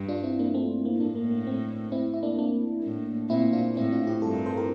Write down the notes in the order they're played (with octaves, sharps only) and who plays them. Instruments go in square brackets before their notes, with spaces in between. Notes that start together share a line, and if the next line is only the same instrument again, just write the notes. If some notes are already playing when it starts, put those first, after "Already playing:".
Already playing: [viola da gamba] G2
[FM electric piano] D4 F4
C4 E4
A#3 D4
A3 C4
A#3
[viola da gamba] A2 [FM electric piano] A#3 D4
[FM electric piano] A#3
A#3
A3 C4
C4 E4
E4
A#3 D4
A#3 D4
[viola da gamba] A2
[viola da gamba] A#2 [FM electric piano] C4 E4
[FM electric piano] D4 F4
[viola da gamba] A2 [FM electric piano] C4 E4
[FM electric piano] D4 F4
E4 G4
[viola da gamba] G2 [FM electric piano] F4 A4
[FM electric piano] G4 A#4
A4 C5
G4 A#4